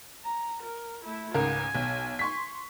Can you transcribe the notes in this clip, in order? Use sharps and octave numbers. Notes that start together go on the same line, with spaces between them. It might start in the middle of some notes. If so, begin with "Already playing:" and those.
A#5
A#4
A3 E4
C#2 G#2 A#4 G#5
B1
C6 C#6 B6